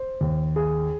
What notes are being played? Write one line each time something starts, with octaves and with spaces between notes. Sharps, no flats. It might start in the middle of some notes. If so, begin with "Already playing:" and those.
Already playing: C5
D#2
G#4